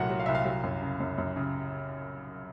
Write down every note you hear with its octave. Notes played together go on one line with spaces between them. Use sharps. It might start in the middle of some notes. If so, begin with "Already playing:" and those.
Already playing: C2 A#2 F#3 A3 F#5
F#3
F5
C2 E5
F5
F#3
F#2
C#3
F#2
F#2
C#3